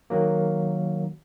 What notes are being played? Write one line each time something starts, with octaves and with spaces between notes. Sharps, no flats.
D#3 F#3 A#3